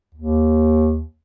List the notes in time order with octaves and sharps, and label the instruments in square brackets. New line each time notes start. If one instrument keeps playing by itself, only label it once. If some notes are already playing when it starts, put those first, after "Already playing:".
[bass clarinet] D#2